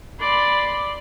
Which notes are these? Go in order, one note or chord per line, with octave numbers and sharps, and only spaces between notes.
D5 B5 C6